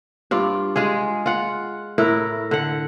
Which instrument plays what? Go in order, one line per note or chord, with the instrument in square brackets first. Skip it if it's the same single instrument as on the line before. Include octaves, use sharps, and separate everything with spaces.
[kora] G2 F4 D5
G#3 F4 G#4
F4 F#5
A2 E4 A#4
D3 F#5